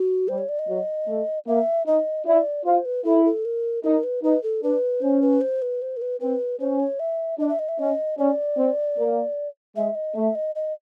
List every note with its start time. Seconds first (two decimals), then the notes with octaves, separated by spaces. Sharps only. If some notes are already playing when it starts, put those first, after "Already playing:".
Already playing: F#4
0.28 G3 C5
0.38 C#5
0.49 D5
0.59 D#5
0.68 F#3
1.08 A3
1.47 A#3 E5
1.86 D#4 D#5
2.26 E4 D5
2.65 F4 C5
2.85 B4
3.05 E4 A4
3.25 A4
3.45 A#4
3.84 D#4 A#4
4.04 B4
4.23 D#4 B4
4.43 A4
4.63 D4 B4
5.02 C#4 C5
5.22 B4
5.41 C5
5.62 B4
5.82 C5
5.97 A#4
6.02 B4
6.20 C4 B4
6.60 C#4 C5
6.80 C#5
7.00 E5
7.39 D4 D#5
7.49 E5
7.59 D#5
7.69 E5
7.79 C#4 D#5
8.18 C#4 D5
8.57 C4
8.97 A#3
9.76 G#3 E5
9.95 D#5
10.15 A3 E5
10.35 D#5
10.55 D#5